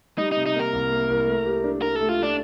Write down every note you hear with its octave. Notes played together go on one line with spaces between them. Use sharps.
G3 D#4
C3 D#4
D#4
A#3 A#4
C2
A#3
C2
A3
G4
D4
D4 A#4
A3 A4
F4
A3 D4